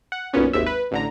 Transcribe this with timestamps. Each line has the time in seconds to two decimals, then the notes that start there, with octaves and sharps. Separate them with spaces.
0.12 F#5
0.33 B1 F#2 A#2 B3 C#4
0.53 G#1 D#2 G#2 E5
0.66 B4
0.91 A1 D3 A#5